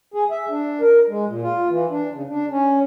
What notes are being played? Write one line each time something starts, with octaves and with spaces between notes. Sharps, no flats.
G#4
E5
D4
A#4
G#3
A#2
F4
E3
D4
C#3
D4
C#4